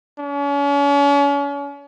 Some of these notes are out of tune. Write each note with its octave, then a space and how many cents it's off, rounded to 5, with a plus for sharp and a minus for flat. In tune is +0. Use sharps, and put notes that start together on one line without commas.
C#4 +40